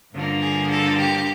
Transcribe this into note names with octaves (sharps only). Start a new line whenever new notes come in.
G2 D3 F3 A#3
G#4
A4
G4